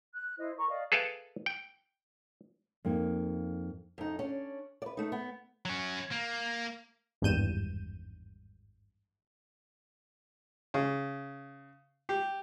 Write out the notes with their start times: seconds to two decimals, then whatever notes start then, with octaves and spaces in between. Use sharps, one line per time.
0.13 F#6
0.38 E4 C5 D#5
0.57 A#4 A#5 C#6
0.70 D5 D#5 F5
0.92 G#4 A4 B4 E5 F5 G5
1.46 G5
2.85 F2 A#3 D#4
3.98 F2 D#4
4.19 C#4 D4
4.82 B4 D5
4.97 A3 D#4
5.12 B3
5.65 F#3 C#4
6.12 A#3
7.22 G#1 E2 G2 G6 D#7 E7
10.74 C#3
12.09 G4